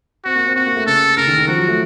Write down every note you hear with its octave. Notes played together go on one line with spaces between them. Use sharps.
C4 F#4
A#3
C4
C4 F#4
A#3
A3
C#3 A4
C#3 A#4
D#3
D#3
F3 F#4
F#3
A3